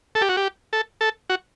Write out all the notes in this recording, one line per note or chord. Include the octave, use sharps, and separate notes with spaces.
A4
G4
F#4
G4
A4
A4
F#4